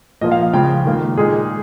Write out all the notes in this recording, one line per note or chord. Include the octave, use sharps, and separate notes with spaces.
A#2 F3 A#3 F4 D#5
F5
F5
C#3 F3 G#3 G5
D#3 A#3 F4
A#2 G#3 D#4 G#4